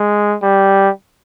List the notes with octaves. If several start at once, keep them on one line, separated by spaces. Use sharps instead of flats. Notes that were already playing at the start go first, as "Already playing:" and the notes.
Already playing: G#3
G3